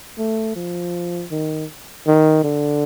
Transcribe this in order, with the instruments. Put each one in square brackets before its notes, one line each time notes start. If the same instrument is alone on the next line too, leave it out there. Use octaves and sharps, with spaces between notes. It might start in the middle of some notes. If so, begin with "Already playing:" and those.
[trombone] A3
F3
D#3
D#3
D3